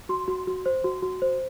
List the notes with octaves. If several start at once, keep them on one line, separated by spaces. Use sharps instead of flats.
F#4 C6
F#4
F#4
C5
F#4
F#4
C5